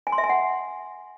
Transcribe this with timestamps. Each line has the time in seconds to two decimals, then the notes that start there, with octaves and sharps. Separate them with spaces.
0.07 G#5
0.12 C6
0.18 E5
0.24 G#5
0.29 F#5